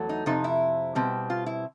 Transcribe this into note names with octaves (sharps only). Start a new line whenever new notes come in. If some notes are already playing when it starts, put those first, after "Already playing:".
Already playing: E2 F#3 A3
D#4
F2 C3 D#4
E4
B2 G3 C4
F4
E4